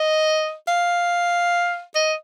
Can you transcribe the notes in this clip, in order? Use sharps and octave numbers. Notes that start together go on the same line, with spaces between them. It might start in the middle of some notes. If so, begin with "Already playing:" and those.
Already playing: D#5
F5
D#5